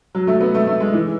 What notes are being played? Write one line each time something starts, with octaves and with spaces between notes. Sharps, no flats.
F#3
A3
B3
A3
A3
G#3
E3